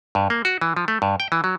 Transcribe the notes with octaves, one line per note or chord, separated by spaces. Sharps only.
G2
A#3
F#4
E3
F3
A3
G2
G5
E3
F#3